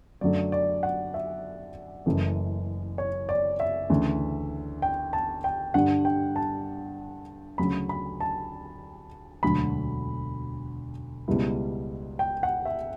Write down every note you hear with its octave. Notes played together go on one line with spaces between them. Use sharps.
F#2 D3 F#3 A3 D5
D5
F#5
E5
F#1 F#2 E3 A3
C#5
D5
E5
D2 C#3 E3
G5
A5
G5
G2 D3 G3 D4 F#5
G5
A5
D2 C#3 F#3 B5
B5
A5
E1 D2 D3 F#3 B5
C#2 B2 G3 B3 E4
G5
F#5
E5